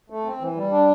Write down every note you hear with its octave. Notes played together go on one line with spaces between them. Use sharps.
A3
C4
E3
G3
D4